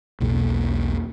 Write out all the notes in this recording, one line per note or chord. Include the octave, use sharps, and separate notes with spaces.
B1 E2 B2 A#3